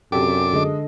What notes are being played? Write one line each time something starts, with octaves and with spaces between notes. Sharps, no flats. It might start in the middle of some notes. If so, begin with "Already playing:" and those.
F#2 C3 D4 G4 A4 D6
D3 G#3 A4 D#5